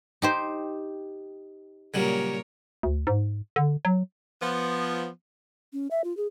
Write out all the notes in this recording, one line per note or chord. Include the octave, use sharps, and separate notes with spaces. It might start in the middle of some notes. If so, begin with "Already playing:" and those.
D#4 G4 C5
A#2 C#3 F#3 G3 A#4 C#5
D2
G#2
D3
F#3
F3 B3
C#4
E5
F4
G#4